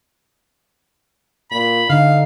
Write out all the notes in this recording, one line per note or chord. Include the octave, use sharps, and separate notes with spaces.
A#2 B5
D3 D#4 F5